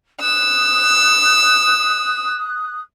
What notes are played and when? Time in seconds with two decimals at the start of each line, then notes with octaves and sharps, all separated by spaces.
0.21 D#6 E6 F#6